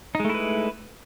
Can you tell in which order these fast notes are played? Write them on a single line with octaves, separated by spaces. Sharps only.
D#4 G#3 A3 E4 B4